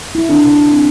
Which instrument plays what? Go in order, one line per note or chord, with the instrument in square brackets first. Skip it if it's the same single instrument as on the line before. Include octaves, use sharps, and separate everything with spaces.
[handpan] E4
[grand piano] D3
[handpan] C3
C4